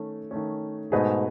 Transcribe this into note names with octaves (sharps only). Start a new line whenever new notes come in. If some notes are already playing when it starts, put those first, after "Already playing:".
Already playing: D#3 A3 C#4
D#3 A3 C#4
G#2 B2 A3 D#4 G#4 B4